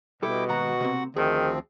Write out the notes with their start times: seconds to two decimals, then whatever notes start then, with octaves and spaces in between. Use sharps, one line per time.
0.23 B2 G3 E4 A4 G5 D6
0.49 D#2 G#2 F#4 F#5 A#5
0.80 C3 A#3 C4
1.16 D2 D#3 F3 C4 G#4